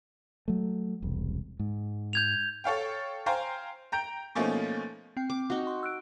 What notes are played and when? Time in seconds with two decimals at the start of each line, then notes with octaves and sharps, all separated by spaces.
0.48 F#3 A3
1.02 E1 C2
1.59 G#2
2.13 G6 G#6 F7
2.64 A4 C#5 F5 G5
3.26 C5 F5 G5 G#5 A#5 C6
3.92 G5 A#5 G6 D7
4.35 B2 F3 A3 A#3 C#4 D#4
5.17 C4 G5
5.30 D6
5.50 D#4 F#4
5.67 C6
5.83 E6 F#6 D7